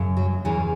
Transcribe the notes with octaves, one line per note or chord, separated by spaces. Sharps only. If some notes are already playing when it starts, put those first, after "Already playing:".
Already playing: F#2 C#3
F#3
E2 C#3 E3 G#4